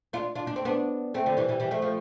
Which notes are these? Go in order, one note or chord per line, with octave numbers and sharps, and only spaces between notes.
D4 F4
D4 F4
D4
C4
B3 D4
A3 C4
D3 F3
E3 G3
E3 G3
E3 G3
F3 A3
F3 A3